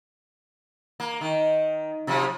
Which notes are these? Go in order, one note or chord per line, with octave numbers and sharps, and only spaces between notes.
A#3
D#3
C3 F3 F#3